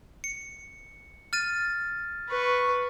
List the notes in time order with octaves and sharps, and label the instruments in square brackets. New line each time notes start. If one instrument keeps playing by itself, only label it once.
[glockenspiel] C#7
F6 A6 D#7
[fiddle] B4 C#6